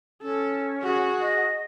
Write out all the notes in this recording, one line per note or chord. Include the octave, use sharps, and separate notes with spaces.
C#4 A4
F#4 G#4
D#5